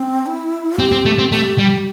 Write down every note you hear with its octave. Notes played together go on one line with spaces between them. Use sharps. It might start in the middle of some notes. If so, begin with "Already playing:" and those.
Already playing: C4
E4
C4 G4
C4
A3
C4
A3 G4
G3